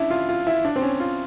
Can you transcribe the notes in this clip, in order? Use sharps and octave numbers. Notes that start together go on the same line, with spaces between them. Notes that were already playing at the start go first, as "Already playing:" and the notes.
Already playing: C#4 D4 E4
F4
F4
E4
D4
C4
C#4
F4